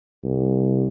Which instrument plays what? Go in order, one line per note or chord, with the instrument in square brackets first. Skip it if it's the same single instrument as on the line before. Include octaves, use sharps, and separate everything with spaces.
[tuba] C2